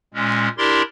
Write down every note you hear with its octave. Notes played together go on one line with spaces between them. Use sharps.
A#2 G#3 C#4
D4 E4 G4 A#4 D5 C6